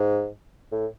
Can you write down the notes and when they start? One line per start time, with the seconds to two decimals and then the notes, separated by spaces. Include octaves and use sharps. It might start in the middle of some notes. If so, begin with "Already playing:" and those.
Already playing: G#2
0.72 A2